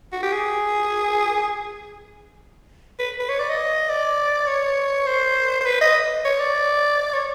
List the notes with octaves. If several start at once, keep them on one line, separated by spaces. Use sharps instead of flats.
F#4
G4
G#4
B4
B4
C#5
D5
D#5
D5
C#5
C5
C5
B4
D#5
C#5
D5
C#5